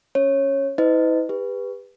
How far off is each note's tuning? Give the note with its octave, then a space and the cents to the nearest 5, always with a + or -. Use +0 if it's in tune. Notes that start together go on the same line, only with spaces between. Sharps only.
C#4 +0 C#5 -15
E4 -35 B4 +40 D#5 +0
G4 +35 B4 +0